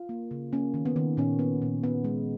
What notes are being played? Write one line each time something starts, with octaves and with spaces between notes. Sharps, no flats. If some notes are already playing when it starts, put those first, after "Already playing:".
Already playing: F4
A#3
C#3
A#3 C#4
D#3
B3
D#3
A#2 C#4
B3
A#2
B3
G#3